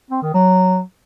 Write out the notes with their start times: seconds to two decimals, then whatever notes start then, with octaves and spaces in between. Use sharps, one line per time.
0.10 C4
0.22 D#3
0.34 F#3